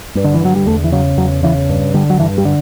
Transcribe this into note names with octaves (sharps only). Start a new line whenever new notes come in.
G2
D3
E3
D3 F#3
G3
E2 A3
E3
C#3 F#3
E2 F#3
C#3 E3
G2
D3 G3
F#3
G2 E3
G3
D3